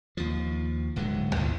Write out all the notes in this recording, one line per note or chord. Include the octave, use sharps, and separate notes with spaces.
D#2 F3
D1 G#2 D3 F#3
A1 D2 B2 F3